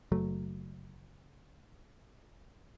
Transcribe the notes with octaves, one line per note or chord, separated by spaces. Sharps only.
F#1 F#3 A3